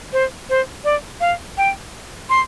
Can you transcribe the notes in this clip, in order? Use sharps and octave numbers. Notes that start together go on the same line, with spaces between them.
C5
C5
D5
F5
G5
C6